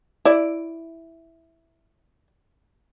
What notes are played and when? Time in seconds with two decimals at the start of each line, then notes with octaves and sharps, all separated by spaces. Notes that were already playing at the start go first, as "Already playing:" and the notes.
0.25 E4 D5